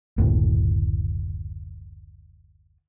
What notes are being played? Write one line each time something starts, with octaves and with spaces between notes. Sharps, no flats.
F#1 D2 A2